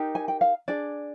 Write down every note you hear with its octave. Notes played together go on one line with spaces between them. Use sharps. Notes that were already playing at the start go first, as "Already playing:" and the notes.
Already playing: D#4 G4 A#4
G#5
G5
F5
D4 G#4 D5